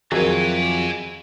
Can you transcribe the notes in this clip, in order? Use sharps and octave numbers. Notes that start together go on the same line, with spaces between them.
F2 D#3 F#3 F#4 G#4 A#4 E5 G#5